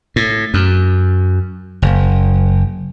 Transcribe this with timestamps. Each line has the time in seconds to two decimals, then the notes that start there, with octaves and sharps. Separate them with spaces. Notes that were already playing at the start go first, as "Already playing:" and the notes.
0.16 A2
0.54 F#2
1.82 F#1